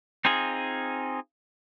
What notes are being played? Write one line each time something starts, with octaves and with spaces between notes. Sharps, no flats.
C4 D#4 F4 G#4